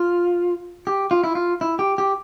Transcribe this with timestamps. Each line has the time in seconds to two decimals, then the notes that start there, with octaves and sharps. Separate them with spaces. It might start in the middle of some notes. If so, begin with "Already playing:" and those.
Already playing: F4
0.87 G4
1.11 F4
1.24 E4
1.35 F4
1.61 E4
1.79 G4
1.98 G4